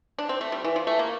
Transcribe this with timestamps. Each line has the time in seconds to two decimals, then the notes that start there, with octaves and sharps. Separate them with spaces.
0.18 D4
0.29 C4
0.41 A3
0.52 G3
0.64 E3
0.76 F3
0.87 A3
0.99 A#3